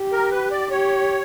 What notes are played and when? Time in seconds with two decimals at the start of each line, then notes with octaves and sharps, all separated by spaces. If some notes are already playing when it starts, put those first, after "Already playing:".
Already playing: G4
0.12 A#4
0.31 B4
0.51 D5
0.71 G4 C#5